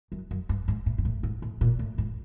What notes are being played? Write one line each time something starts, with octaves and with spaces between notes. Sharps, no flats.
F#2
F#2
G2
G#2
A2
G#2
A2
G#2
A2
A#2
A2
G#2